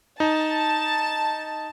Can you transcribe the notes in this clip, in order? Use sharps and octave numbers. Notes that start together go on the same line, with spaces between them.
D#4 A5